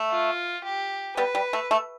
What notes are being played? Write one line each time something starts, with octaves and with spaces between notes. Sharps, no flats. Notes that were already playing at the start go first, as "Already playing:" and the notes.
Already playing: A3
F4
G4
G3 B3 B4
G3
A3
A3